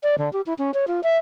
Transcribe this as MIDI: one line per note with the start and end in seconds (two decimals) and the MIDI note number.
0.03 0.15 74
0.18 0.31 50
0.33 0.41 67
0.46 0.54 64
0.58 0.71 61
0.74 0.85 73
0.87 1.01 65
1.03 1.17 76